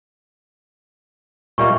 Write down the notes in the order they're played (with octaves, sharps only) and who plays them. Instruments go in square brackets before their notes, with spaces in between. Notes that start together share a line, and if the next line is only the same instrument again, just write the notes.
[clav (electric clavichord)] A#2 G3 A#3 [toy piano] D#5 E5 C#6